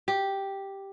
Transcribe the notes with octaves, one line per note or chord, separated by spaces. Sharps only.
G4